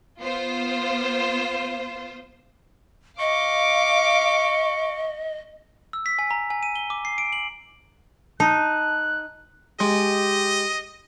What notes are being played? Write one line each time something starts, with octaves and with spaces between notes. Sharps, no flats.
B3 F4 C5
D#5 F5 C#6 D6
E6
B6
G#5
A#5
G#5
D#7
G7
D6
C7
D7
F#7
D#4 A5 F#6
G#3 G4 D#5